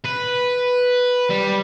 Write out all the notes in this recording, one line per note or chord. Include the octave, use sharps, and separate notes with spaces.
B4
G3